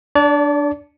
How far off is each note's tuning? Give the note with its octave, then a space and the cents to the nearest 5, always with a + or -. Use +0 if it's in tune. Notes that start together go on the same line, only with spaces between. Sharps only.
D4 +0 D5 -35